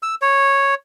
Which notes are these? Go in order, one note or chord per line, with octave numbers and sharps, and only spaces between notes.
E6
C#5